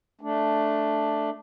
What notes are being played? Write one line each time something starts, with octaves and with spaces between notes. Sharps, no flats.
A3 D4